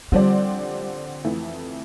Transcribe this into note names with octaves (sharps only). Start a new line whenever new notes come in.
D3 F3 G3 C4 G4 D5
F2 E3 A3